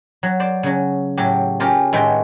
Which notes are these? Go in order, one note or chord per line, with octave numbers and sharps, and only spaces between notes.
F#3
C5 D5
C#3 F#3
A2 F#3 G4
C#4 F4 G4 A#4
A2 D#3 G#3 F#4 B4 G5